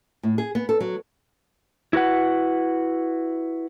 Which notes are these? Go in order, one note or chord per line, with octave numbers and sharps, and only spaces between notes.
A2
G#4
B3
A4
F#3
E4 F#4 B4 F#5